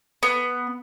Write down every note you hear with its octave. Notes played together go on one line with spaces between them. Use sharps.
B3